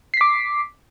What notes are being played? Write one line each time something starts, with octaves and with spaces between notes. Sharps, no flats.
D6 B6 C7